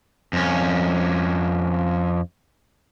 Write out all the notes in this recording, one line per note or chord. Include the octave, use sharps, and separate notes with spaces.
F2 C#4